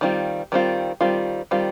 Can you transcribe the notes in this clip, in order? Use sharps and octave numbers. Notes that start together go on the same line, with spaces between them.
D#3 G3 C4 F4
D#3 G3 C4 F4
D#3 G3 C4 F4
D#3 G3 C4 F4